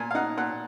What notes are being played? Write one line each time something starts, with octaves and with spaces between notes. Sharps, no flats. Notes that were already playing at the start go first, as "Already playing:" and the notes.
Already playing: A#2 G#5
F5
D#4 F#5
A#2 F#5